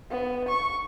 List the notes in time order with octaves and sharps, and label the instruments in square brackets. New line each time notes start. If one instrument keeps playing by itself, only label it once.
[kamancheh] B3
C#6